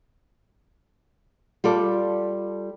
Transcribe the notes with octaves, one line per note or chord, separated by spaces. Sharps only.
G3 F4 A4 D5